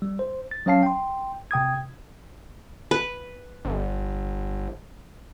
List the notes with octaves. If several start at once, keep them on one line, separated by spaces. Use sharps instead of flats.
G3
C5
A6
F#3 C#4 C#5 F5 A5 C7
G5 C6
C3 G5 D#6 G#6
B4
G1